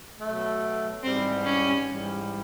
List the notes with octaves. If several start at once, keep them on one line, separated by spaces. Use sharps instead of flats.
B2 F#3 A3
G#2 E3 G3 C4
C#4
G#2 E3 G3